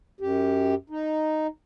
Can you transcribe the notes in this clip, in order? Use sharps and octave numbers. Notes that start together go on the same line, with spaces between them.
F#2 G4
D#4